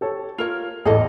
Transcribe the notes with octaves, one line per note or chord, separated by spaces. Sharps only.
G4 A4 C#5
F4 A#4 C#5 F7
A1 E2 G#4 A4 D#5